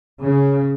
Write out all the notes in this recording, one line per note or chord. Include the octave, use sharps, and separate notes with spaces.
C#3